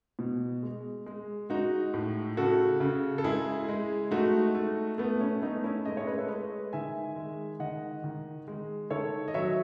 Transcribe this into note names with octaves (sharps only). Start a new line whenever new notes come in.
B2
G#3
G#3
G#3 D#4 F#4
A2
C#3 F#4 A4
C#3
A4
G#3 E4 G#4
G#3
A3 D#4 F#4
A3
A3 B3
C#4
A3 B3 D#4
C#4 E4
G#3 D#5
C#5
B4
A4 C#5
G#3 B4 D#5
D#3 E5 G#5
G#3
D#3 D#5 F#5
D#3
G#3
D#3 A4 C#5
D#5
F#3 C#5 E5